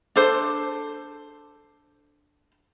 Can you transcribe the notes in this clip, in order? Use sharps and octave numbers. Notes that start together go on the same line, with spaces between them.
D4 A4 C5